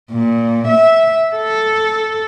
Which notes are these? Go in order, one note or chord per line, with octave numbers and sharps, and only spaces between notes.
A#2
E5
A4